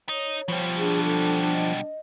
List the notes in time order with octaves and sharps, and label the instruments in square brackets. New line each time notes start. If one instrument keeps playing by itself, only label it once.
[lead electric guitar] D#4 [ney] C#5
[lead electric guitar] B2 G3 [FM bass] F3
[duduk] D4 [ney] G#4
[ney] A4
D#5